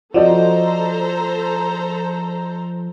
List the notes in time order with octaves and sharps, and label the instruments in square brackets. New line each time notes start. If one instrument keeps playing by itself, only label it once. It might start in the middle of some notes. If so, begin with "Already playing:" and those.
[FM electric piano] F3 [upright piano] F#4 D5 D#5 [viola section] A4 C5 A#5